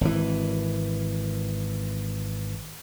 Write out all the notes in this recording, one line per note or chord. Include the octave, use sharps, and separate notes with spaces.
G#1 E3